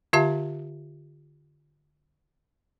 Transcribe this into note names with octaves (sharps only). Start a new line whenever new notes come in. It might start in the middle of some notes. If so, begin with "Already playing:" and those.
D3 F4 G4 E5 F5 A5